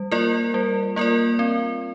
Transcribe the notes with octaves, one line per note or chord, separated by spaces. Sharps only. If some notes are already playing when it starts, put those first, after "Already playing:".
Already playing: G3
A#3 F4 A#4 D5
G3
A#3 F4 A#4 D5
C4